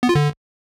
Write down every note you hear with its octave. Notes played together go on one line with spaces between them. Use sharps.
B3
F4
D3